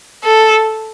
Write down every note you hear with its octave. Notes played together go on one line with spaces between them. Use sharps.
A4